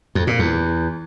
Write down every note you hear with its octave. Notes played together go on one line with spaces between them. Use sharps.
F2
A#2
E2